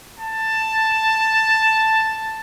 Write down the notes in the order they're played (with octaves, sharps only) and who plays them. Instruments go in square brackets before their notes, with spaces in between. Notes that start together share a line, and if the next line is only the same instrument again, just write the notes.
[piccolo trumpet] A5